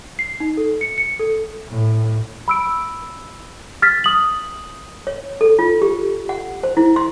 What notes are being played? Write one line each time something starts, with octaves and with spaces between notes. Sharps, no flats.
C7
D#4
A4
C#7
C#7
A4
A2
B5 E6 D7
F6 A6 B6
D#6 F#7
C#5
A4
F4
G4
F#5
C5
E4
C6